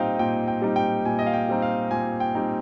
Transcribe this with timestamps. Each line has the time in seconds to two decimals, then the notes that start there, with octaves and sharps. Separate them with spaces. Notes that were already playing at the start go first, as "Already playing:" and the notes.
Already playing: A#2 G3 C4 D#4 D#5 F5 G5
0.19 A#2 G5
0.48 G5
0.62 G3 C4 D#4
0.76 G5
1.05 A#2 G#5
1.19 D#5
1.27 F5
1.34 G5
1.49 G3 C4 D#4
1.62 F5
1.91 A#2 G#5
2.20 G5
2.35 G3 C4 D#4